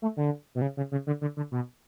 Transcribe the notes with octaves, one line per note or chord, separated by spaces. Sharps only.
A3
D3
B2
C#3
C#3
C#3
D3
D3
D3
B2